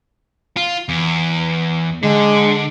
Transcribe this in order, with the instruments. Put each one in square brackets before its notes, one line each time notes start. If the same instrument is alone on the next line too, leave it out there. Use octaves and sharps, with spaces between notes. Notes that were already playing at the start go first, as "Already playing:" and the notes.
[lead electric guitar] F4
E2
[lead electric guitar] D3 [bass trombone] G#3